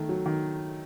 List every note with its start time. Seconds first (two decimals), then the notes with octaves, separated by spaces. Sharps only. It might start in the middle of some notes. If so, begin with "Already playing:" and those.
Already playing: D#3 A3
0.09 F#3
0.26 D#3